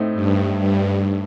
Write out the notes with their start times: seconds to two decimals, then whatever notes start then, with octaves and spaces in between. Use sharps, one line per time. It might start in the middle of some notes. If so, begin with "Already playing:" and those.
Already playing: A2 A3 C4 D#4
0.14 G2
0.59 G2